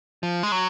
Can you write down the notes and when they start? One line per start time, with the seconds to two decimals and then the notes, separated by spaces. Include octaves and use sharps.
0.23 F3
0.43 G#3
0.52 F#3